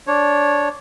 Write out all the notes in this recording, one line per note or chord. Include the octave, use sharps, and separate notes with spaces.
D4 C#5